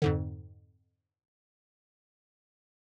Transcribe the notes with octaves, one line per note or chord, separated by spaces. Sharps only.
F2 G#2 D3